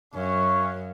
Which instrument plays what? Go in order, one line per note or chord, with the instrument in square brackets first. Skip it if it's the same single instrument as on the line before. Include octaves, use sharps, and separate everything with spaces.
[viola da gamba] F#2 [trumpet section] C#4 F#4 C#5 F5